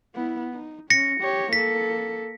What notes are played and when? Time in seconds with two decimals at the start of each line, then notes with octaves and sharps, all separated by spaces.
0.15 B3 E4
0.54 D#4
0.90 C#4 A#6 C#7
1.21 G4 C#5
1.53 A#3 A4 B6